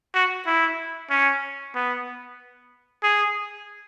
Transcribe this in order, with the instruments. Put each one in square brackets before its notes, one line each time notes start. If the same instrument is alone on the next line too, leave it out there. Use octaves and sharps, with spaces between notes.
[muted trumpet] F#4
E4
C#4
B3
G#4